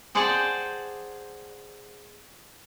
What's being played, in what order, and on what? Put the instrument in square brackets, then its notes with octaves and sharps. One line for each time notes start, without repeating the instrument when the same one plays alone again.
[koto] G#4 C5 D5 F#5 G5 A5